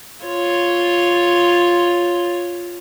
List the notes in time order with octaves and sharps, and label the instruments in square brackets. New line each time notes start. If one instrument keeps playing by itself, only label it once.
[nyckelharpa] F4 C#5